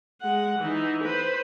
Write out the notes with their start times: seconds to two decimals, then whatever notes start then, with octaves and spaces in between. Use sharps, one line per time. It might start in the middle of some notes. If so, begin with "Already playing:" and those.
0.21 G#3 F#5
0.59 E3 D#4
1.03 B4 C5